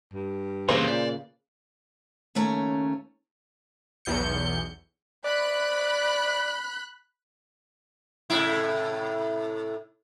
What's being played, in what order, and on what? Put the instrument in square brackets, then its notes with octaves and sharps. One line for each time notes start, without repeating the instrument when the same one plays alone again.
[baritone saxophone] G2
[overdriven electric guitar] E2 A#2 [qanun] C#3 A#3 B4 [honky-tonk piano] C5
[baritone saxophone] A#2 [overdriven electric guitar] D5
[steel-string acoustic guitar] D#2 C#3 A3 C#4 A#5
[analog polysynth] B1 E2 G6 C#7
[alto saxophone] D5 [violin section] B5 F#6
[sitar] A2 C3 E4